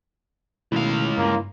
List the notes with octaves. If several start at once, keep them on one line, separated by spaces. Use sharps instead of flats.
C#2 B2 D#3 A3 E4 F5
G2 A#3